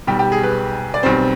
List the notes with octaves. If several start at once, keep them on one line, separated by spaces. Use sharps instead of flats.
B1 B2 G3 G4
G4
G#4
B4
D5
B1 B2 G3 C4 C5